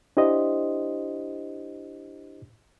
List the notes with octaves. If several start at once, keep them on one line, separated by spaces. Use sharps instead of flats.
D4 E4 G4 C5 D#5